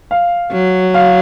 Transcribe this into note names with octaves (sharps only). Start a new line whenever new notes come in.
F5
F#3
F5